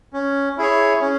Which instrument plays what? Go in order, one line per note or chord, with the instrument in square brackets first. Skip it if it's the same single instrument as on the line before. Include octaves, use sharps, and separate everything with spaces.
[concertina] C#4
E4 G#4 C#5
C#4